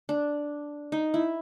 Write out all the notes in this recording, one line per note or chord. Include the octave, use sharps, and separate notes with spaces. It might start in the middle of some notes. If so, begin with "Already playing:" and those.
D4
D#4
E4